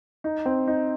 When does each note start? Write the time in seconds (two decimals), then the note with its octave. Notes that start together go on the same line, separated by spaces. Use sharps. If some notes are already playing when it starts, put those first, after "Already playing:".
0.24 D#4
0.46 C4
0.67 D#4